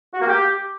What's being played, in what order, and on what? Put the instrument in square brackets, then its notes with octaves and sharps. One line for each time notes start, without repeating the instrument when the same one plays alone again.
[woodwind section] F#4
A#3
G4